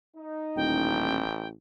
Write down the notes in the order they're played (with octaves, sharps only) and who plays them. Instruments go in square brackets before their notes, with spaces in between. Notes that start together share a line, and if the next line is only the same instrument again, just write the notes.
[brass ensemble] D#4
[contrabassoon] D#1 [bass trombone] A1 [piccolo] G5